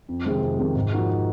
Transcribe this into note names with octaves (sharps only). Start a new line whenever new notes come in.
F2
C3 D#3 G#3 C4
F2
C3 D#3 G#3 C4
G#2
F3 A#3 D#4 F#4